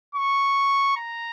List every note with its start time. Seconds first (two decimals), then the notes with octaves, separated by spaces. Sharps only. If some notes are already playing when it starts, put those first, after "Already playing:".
0.15 C#6
0.97 A#5